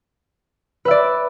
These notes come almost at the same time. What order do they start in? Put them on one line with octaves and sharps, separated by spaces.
B4 E5 D5